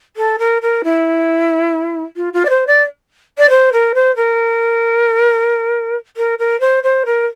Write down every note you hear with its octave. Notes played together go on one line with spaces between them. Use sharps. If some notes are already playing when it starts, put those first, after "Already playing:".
A4
A#4
A#4
E4
F4
F4
D5
C5
D5
D5
C5
A#4
C5
A#4
A#4
A#4
C5
C5
A#4